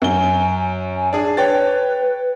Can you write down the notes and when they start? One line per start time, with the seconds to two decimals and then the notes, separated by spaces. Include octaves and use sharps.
0.02 F#2 G#5 G7
0.96 G#5
1.13 D4 G#4 A5
1.37 B4 C#5 G5 A6